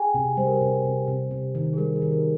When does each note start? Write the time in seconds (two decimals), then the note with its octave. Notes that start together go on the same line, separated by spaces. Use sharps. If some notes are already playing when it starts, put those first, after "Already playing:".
Already playing: G#4 G5 G#5
0.14 C3
0.37 G3 C5
0.47 A#4
0.54 C5
0.61 C3
0.84 C3
1.08 C3
1.31 C3
1.55 D#3
1.73 G#4
1.77 G3 A#4
1.96 G#4
2.02 D#3
2.12 A#4